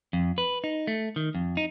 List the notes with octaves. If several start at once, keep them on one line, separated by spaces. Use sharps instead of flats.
F2
B4
D#4
A3
D#3
F2
D#4